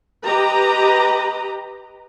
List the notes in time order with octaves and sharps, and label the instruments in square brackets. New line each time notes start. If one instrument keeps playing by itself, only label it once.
[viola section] G4 B4 D#5 A#5